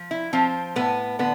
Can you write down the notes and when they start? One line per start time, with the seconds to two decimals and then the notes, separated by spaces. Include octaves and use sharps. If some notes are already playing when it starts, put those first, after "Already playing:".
Already playing: F3
0.11 E4
0.33 F3 C4 F4
0.76 A2 B3 B4
1.19 D3 B3